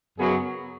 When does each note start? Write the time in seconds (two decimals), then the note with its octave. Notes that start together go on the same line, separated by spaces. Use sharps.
0.18 F#2 C#3 F#3 B3 G#4